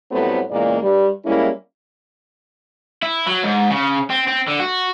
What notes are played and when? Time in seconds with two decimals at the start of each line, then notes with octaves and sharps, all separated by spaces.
0.11 A2 F#3 G3 A3 B3 C4
0.51 E2 A#2 C#3 G#3 A#3 D5
0.82 G2 G3
1.25 G3 G#3 A#3 C#4 E4
3.02 E4
3.26 F#3
3.43 G#2
3.70 C#3
4.10 C4
4.28 C4
4.48 D3
4.60 F#4